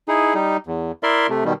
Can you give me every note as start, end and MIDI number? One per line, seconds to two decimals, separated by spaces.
0.08 0.34 63
0.08 0.34 64
0.08 0.34 68
0.34 0.57 55
0.34 0.57 63
0.67 0.92 40
1.03 1.27 64
1.03 1.27 70
1.03 1.27 74
1.03 1.27 76
1.03 1.27 84
1.29 1.44 48
1.29 1.44 57
1.45 1.53 47
1.45 1.53 51
1.45 1.53 55